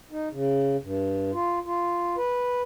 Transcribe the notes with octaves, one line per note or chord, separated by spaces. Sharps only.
D#4
C#3
G2
F4
F4
B4